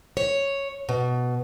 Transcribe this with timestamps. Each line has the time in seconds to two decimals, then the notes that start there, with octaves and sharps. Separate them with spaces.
0.17 C#5
0.89 B2